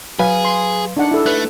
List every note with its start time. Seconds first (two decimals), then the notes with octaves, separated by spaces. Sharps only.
0.19 F#3 G#4 B4 F5
0.45 C6
0.97 D4 D#4 F#5
1.11 E4 A4
1.26 A3 B4 F#6